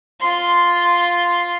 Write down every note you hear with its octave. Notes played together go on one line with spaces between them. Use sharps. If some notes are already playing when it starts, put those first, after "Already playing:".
F4 C6